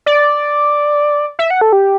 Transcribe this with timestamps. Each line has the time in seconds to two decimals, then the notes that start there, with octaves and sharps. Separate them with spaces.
0.06 D5
1.39 E5
1.51 F#5
1.61 A4
1.73 G4